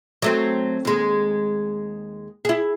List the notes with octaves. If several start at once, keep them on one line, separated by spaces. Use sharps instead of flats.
F#3 A3 C4
D#2 G#3
E4 G#4